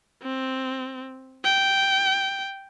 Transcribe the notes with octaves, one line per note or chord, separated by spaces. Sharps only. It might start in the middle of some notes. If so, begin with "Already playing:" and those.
C4
G5